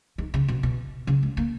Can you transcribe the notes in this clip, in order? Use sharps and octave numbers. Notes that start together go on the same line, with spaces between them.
D#3
C#3
B2
B2
C#3
G#3
A#3